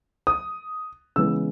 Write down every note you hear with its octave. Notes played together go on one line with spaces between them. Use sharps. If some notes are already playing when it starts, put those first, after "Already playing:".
D#6
C#3 E3 G#3 B3 E6